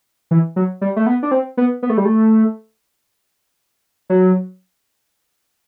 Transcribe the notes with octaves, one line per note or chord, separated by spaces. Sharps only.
E3
F#3
G3
A3
B3
D4
C4
B3
B3
A3
G3
A3
F#3